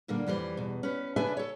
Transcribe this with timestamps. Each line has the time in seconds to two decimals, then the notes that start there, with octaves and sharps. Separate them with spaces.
0.08 A#2 D3 G3 A#3
0.27 F2 E3 G3 G#4 C5
0.57 E2 B2
0.83 C#4 B4
1.16 C#3 D4 A4 B4 E5 G#5
1.37 A4 C#5